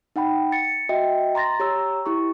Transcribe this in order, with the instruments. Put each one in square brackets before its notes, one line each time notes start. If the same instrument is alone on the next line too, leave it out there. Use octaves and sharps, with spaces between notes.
[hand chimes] D#4 F#5 G5 B5
A6 C#7
F#4 D#5 E5 G5
A#5 C6 A6 A#6
G4 C#5 A#5 E6
E4 G4 C#6